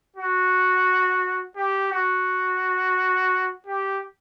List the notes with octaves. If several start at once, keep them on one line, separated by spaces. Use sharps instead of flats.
F#4
G4
F#4
G4